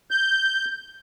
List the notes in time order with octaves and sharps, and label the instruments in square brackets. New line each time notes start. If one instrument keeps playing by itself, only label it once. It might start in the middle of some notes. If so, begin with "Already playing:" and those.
[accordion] G6